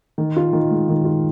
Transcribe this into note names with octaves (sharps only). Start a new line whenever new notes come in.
D#3
F4
D#3
G#3
D#3
F4